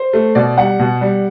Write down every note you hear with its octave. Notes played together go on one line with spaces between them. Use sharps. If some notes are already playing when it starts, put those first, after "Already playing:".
Already playing: C5
A3
B2 D5
G3 F#5
B2
G3